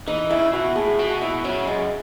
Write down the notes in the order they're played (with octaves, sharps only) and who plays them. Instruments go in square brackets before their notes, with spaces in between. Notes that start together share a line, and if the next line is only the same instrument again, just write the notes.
[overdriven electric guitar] E3 [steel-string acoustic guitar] D#4
[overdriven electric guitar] C#3 [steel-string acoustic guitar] E4
[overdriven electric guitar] B2 [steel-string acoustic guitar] F#4
[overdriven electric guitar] A2 [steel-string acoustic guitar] G#4
[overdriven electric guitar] B2 [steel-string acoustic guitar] F#4
[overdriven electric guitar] B2 [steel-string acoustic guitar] E4
[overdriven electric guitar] C#3 [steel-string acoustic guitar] F#3
[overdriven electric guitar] F#2 [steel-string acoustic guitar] G#3